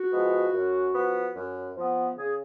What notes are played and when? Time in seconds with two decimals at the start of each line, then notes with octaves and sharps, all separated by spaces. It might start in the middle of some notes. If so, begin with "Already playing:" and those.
Already playing: F#4
0.12 F3 G#3 B3
0.53 F#2
0.94 F3 B3
1.35 F#2
1.76 F3 B3
2.17 C#3 G#4